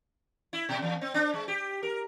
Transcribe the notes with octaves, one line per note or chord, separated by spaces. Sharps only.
E4
B2
E2
C4
D4
G#3
G4
A#4